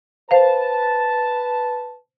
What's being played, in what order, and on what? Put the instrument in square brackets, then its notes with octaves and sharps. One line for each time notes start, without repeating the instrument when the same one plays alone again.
[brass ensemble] B4 A5 [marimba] C5 F5